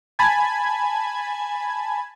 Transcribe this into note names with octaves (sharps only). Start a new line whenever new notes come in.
G#5 A5 B5 G#6